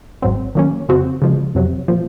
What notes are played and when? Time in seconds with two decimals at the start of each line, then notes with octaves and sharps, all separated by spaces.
0.22 G#1 G#2 F#3 C4
0.55 D#3 F#3 A#3 C#4
0.89 F2 C#3 F3 C4 F#4
1.22 C#3 F3 G#3
1.55 F2 C3 F#3
1.88 A#2 F3